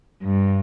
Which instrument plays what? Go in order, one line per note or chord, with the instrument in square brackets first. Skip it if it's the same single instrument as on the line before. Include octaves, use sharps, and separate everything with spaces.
[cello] G2